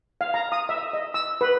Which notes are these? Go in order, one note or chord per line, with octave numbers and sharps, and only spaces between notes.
F5
A#5
D#6
E5
D#5
E6
B4